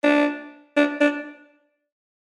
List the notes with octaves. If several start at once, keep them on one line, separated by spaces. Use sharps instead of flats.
D4
D4
D4